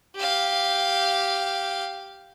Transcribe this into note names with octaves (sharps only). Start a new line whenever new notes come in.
G4 F5